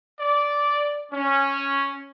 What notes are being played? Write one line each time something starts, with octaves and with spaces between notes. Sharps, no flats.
D5
C#4